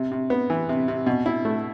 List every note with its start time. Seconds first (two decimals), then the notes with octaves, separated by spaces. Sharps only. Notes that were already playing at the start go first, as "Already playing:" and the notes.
Already playing: C3
0.12 C3
0.30 B3
0.50 E3
0.69 C3
0.88 C3
1.07 B2
1.26 E4
1.45 A3